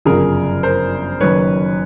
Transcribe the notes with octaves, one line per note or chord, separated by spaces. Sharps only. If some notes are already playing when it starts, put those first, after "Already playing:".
G1 F#2 C#3 F3 G#4 A#4
A#4 C5
F#1 F#2 D#3 B4 C#5